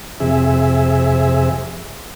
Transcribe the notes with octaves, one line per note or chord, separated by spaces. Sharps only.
F2 C3 G#4 E5